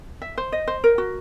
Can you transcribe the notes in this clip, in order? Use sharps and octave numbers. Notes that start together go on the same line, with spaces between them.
E5
C5
D#5
C5
A#4
F#4